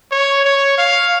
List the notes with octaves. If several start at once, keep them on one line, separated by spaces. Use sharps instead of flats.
C#5
C#5
F5